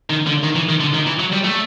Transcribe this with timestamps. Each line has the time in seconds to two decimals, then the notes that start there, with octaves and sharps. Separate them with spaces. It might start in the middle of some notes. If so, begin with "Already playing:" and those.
0.10 D#3
0.27 D3
0.43 D#3
0.56 E3
0.69 D#3
0.81 D3
0.94 D#3
1.07 E3
1.20 F#3
1.33 G3
1.44 A3